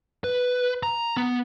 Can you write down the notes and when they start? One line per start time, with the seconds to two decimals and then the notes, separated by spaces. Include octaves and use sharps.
0.24 B4
0.83 A#5
1.17 B3